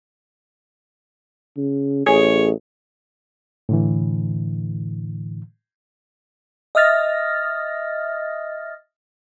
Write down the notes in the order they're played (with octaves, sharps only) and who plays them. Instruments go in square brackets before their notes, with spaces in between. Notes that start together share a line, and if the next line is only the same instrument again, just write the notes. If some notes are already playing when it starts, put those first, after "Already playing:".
[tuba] C#3
[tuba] A1 [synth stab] G#4 [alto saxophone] C#5
[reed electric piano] A2 D3 E3
[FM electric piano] D#5 E5 D#6 F6 A6 A#6